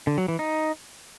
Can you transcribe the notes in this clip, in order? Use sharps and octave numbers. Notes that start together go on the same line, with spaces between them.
D3
F#3
E3
D#4